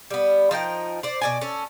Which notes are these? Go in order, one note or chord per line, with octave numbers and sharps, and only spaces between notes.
G3 B3
F3 D#4 A#4 G5
C5 D5
B2 D5 G#5
C#4 A4